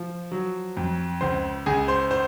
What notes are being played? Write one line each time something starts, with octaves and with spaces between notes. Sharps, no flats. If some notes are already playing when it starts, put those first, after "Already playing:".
Already playing: F3
F#3
F2
C#2 C5 C6
C#2 G#4 G#5
C5 C6
C5 C6